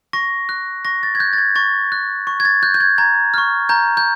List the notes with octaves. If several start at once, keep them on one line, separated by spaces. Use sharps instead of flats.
C#6 A#6
F#6
C#6 A#6
A6
G#6
F#6 G6
A6
G#6
C#6 A6
F#6
C#6
G#6
A6
F#6 G6
G6
G#6
A#5 G#6
C#6 F6
A#5 G6
G6